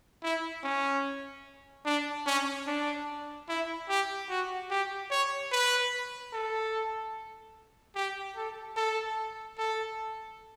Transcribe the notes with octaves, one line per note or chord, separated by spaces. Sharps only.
E4
C#4
D4
C#4
D4
E4
G4
F#4
G4
C#5
B4
A4
G4
A4
A4
A4